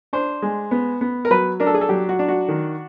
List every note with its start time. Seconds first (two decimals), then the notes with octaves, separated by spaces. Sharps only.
0.13 D4 C5
0.42 G#3
0.71 B3
1.01 B3
1.25 A#4
1.31 F#3 B4
1.60 D4 A#4
1.67 A4
1.74 G#4
1.81 A4
1.89 F#3 G4
2.09 F#4
2.19 D4
2.28 F#4
2.49 D#3